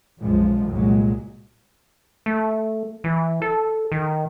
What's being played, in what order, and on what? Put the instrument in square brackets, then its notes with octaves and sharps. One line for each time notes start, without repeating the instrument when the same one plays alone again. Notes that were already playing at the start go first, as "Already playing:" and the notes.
[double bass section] B1 F#2 F3 G#3
C2 A#2 F#3 G#3
[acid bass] A3
E3
A4
D#3